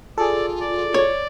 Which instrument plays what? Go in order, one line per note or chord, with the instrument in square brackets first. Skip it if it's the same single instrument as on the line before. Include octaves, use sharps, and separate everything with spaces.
[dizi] F4 [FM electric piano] G#4 A4 [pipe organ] D5
[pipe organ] D5
[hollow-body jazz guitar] C#5